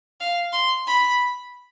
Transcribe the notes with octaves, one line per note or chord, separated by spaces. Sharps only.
F5
C6
B5